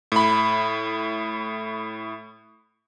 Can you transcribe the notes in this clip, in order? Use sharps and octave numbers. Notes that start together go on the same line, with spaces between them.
A2 B5